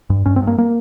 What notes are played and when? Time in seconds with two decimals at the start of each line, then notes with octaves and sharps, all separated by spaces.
0.10 G2
0.26 G2 C#4
0.36 C4
0.42 G2
0.47 A#3
0.58 A#3